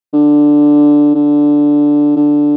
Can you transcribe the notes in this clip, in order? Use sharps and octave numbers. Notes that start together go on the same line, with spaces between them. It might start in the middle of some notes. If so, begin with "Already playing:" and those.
D3
D3
D3